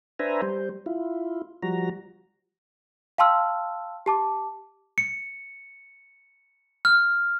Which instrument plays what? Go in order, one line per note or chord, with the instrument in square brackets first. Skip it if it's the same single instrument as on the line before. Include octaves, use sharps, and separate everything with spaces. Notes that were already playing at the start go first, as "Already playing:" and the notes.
[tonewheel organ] D4 B4 C5 E5 G#5 A#5
G3 C5
E4 F4
F3 G3 F#4 A#5
[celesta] F5 G5 A5 C6 E6 F6
G4 A5 D6
[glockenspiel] C#7
F6